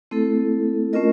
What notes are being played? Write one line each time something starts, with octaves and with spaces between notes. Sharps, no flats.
A3 C4 E4 A4
A3 C#4 F4 A#4 D#5